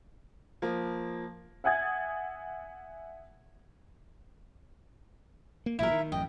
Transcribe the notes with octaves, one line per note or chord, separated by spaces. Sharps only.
F3 A#3
E5 F#5 G#5 D#6 G#6 A6
A#3
A1 A#2 F#3 E4 A#4 E5
D#3
A1 F#2 D#5 G5